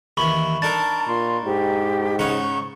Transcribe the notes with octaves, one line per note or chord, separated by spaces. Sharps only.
D#2 E3 B5 C#6 F#7
D4 D#4 A#4 A5 A6
A#2 C6
G#2 G4
C#3 D#4 F#5 C#6